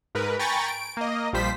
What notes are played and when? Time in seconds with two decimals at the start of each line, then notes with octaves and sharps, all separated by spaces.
0.15 G#2 A#4 B4
0.39 G5 G#5 A#5 B5 C#6 A6
0.68 D7
0.97 A#3 D#5
1.33 A#1 F3 G3 C5 B6